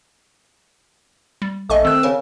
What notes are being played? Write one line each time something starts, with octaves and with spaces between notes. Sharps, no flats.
G3
A#1 A3 D#5 G#5 C#6
D#3 C4 E6 F#6
C#3 A#4